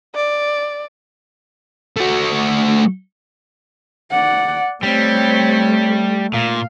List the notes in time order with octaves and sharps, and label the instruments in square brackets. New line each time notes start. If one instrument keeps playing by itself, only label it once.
[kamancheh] D5
[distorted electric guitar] A3 F#4
[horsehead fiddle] D5 F#5
[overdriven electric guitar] G3 [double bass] A3 [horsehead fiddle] C4 C#5
[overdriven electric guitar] A#2 [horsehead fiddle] F5